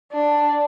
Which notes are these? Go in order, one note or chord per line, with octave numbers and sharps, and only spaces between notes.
D4